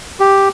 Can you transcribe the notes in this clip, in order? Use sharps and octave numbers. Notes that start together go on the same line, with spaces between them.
G4